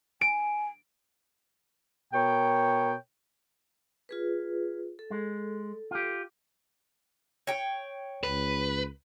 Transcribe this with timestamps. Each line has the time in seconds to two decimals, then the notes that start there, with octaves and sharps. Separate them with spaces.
0.21 G#5 D7
2.12 B2 A#4 C#5 G5
4.09 F4 G#4 B4
4.99 A4
5.11 G#3
5.91 F4 G4
7.47 C#5 G5
8.23 C#2 B4